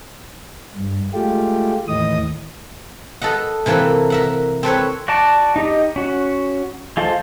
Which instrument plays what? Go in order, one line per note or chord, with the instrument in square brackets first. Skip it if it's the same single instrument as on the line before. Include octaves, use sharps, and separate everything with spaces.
[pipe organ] G2
G#3 A3 F4 G4
D#2 A2 E3 D#5 D#6
[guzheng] A4 B4 D#5 F#5
C3 E3 A#3 A4 B4
A#4 E5 F#5
C4 A4 B4 C#5
[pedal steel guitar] F#4 D5 A5 D6
D#4 G4 D#5
C#4 F#4
G#3 F4 A4 C5